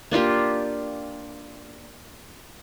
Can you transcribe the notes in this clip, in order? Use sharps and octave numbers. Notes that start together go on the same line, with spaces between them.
A#3 D4 F4 G4